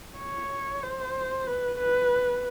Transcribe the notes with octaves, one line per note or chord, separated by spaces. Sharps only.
C#5
C5
B4
B4